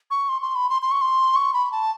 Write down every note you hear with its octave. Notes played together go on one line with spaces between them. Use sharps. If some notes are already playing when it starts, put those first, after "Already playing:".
C#6
C6
C6
B5
C6
C6
C#6
C6
C#6
B5
A5